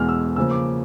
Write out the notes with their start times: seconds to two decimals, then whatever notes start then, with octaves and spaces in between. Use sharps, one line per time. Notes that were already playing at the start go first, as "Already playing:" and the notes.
Already playing: E2 B2 G#3 F6
0.09 E6
0.36 C#3 F3 A#3 E6
0.51 D6